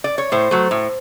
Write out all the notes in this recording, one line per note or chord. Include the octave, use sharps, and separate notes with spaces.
D5
C#5
A2 C5
F#3 A3
A2